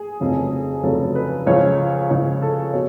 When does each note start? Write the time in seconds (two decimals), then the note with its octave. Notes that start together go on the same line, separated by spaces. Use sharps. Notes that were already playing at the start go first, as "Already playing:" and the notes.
Already playing: G#4
0.20 F1 F2 C#3 F#3
0.83 F1 F2 C#3 F#3 A4
1.15 B4
1.46 C#2 C#3 F3 C#5
2.10 C#2 C#3 F3 C#5
2.42 A4
2.73 B2 C#5